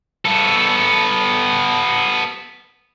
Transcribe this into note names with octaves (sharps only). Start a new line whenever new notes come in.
B3 A4